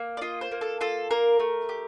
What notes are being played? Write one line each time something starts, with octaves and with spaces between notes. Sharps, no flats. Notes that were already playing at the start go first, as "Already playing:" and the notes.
Already playing: A#3
D5
F4 D#5
C5
A#3
A4
F4 A4
A#3 A#4
A3
G4